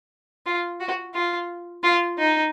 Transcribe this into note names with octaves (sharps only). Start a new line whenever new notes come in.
F4
F#4
F4
F4
D#4